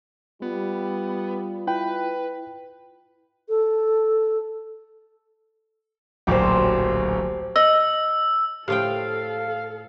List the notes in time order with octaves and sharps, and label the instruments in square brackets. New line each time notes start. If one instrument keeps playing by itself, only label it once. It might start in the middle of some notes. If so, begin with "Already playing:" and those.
[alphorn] G3 [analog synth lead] B3 [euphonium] F4
[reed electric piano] E4 G5 [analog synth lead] B4
[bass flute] A4
[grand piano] D1 A#1 F#3 [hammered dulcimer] G4 C5
[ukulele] D#5 [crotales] E6
[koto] A2 F3 G5 [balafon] G4 [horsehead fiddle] A4 [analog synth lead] F5